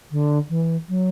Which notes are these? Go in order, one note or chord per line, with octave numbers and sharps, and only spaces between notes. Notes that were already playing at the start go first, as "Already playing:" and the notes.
D3
E3
F#3